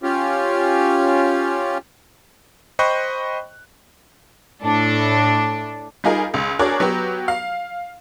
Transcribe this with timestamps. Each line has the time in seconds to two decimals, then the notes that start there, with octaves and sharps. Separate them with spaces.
0.03 C#4 F4 G4
2.79 C5 D#5 G5 B5 C#6 F#6
4.63 A2 D4 A4
6.04 G3 D#4 F4 G#4 A#4
6.34 C#2
6.59 D4 F#4 G#4 A#4 C#5 D5
6.80 F#3 B3 F#4 G4
7.28 F5